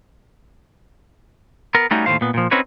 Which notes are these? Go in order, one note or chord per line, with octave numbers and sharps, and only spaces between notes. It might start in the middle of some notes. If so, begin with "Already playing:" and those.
B3 A#4
G3 A3 C#4 D#4 F#4
D#2 A2 G#3 C5 F5
A#2 B3
A#2 F3
C4 C#4 D#4 F#4 B4 C#5